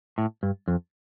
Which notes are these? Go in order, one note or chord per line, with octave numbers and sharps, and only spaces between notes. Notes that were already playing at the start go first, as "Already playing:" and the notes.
A2
G2
F2